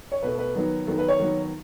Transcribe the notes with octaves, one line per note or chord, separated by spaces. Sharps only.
C#5
B2 A3 B4
B4
D#3 F#3 B3
D#3 F#3 B3 A4
B4
C#5
D#3 F#3 B3